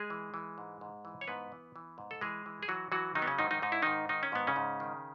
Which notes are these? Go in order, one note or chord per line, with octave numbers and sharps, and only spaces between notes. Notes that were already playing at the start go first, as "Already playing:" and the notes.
Already playing: G#3 G#4
E3
E3
G#2
G#2
E3
C#5
G#2 B3 B4
E3
E3
G#2
A4
E3 G#3 G#4
E3
G#4
E3 F#3 F#4
E3 F#3 F#4
D#3 F#3 D#4
B3
C#3 C#4
G#2 D#3 D#4
D#3 D#4
G#2 D#4
E4
G#2 D#3 D#4
D#3 D#4
C#4
G#2 B3
C#3 C#4
G#2
D#3